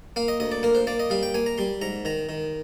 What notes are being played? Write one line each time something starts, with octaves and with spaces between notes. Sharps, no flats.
A#3 F5
D#5
D2 D#5
D5
A#3 A#4
C5
A#3 D5
D#5
G3 F5
G5
A#3 G#5
A#5
G3 C6
G#2 A#5
D#3 A#5
D#3